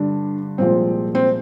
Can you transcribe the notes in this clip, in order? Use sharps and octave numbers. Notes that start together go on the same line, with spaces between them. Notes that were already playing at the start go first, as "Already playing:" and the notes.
Already playing: G2 D3 G3 D4
C2 A#2 F3 G#3 C4
C4